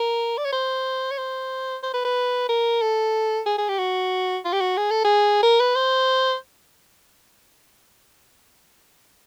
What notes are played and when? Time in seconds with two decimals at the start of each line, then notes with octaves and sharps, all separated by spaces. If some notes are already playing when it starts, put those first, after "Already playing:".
Already playing: A#4
0.37 D5
0.45 C#5
0.52 C5
1.11 C#5
1.18 C5
1.83 C5
1.93 B4
2.05 B4
2.49 A#4
2.82 A4
3.46 G#4
3.58 G#4
3.69 G4
3.79 F#4
4.45 F4
4.52 G4
4.60 F#4
4.77 G#4
4.90 A4
5.05 G#4
5.43 A#4
5.60 B4
5.76 C5